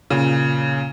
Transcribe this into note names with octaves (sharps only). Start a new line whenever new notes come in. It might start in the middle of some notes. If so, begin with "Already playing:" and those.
A#2 C#3